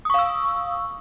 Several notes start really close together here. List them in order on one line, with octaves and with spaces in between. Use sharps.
D#6 C#6 F5 E6